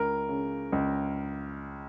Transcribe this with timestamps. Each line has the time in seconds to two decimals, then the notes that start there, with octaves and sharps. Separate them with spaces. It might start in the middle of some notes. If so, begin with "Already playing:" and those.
Already playing: C#2 A#4
0.29 C#3
0.72 C#2